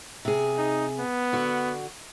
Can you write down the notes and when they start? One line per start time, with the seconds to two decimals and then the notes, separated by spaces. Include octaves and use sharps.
0.25 C3 G#4
0.58 D#4
0.99 B3
1.33 D3 F#4